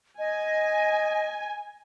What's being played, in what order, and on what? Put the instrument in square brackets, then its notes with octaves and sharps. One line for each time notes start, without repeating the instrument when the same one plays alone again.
[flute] D#5 [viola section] G#5